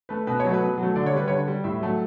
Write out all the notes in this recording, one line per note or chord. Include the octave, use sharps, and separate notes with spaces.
A3 B4
B2 B4
F#3 A3 C#5
B4
B2
F#3
A3
D3 D5
C#5
G3 B4
D3 C#5
G3
A2 E5
F#3 A3